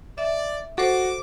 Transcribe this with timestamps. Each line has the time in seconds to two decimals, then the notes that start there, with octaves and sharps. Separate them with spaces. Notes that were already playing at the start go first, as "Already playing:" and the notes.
0.18 D5 E5
0.78 F#4 A4 C5 D6